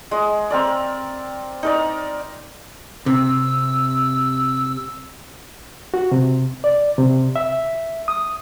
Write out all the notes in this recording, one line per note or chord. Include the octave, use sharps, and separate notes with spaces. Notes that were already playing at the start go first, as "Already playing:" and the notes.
G#3 D#5
C4 A#4 D5
D#4 A#4 D5
C3 E6
F#4
C3
D5
C3
E5
D#6